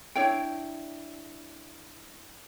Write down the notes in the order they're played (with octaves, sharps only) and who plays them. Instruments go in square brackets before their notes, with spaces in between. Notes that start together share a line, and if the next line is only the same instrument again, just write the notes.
[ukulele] D4 E4 C#5 G5